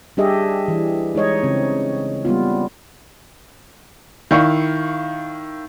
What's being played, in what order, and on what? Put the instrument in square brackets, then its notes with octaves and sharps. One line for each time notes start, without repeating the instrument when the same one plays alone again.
[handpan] G3 D4 G4 G#4 D#5 E5
E3
G#3 D#4 C#5 D#5
C#3 C4
G3 A#3 B3 F4
[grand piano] D#3 E4 F5 C#6